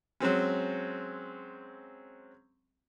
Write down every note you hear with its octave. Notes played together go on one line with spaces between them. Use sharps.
F#3 G#3 C4 C#4